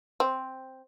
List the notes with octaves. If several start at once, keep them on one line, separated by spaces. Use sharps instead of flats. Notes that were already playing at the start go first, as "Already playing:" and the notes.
C4